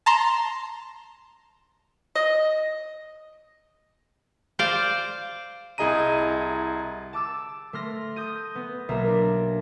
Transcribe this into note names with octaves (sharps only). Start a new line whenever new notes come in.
A5 A#5 C6
D#5
C5 D5 F5
C2 E4 G#4 D#5 A#5 D#7
A5 D6 E6
A3 C6 F6 A#6
D#6 G6 A#6 D#7
B3
B1 A#3 E5 A#5
D4